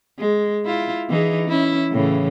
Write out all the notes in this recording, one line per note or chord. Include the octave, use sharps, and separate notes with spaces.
G#3
E4 F4
E3 D#4 G#4
C#4 E4
A2 C#3 E3